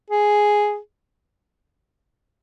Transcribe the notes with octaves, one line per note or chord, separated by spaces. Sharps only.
G#4